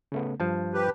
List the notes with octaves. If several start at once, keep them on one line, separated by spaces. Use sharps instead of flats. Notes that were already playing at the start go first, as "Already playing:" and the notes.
C#3 A3 B3
G2 F3 A5
G4 B4